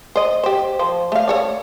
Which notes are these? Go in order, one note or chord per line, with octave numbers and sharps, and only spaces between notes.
C5 D#5
G4 C5
F3 C5
A3 F5
A4 C#5 D5